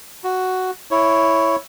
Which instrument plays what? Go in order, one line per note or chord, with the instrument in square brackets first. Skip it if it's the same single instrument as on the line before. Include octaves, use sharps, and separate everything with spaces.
[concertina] F#4
E4 C#5